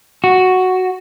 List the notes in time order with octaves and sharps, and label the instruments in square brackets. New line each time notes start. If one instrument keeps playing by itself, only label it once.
[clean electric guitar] F#4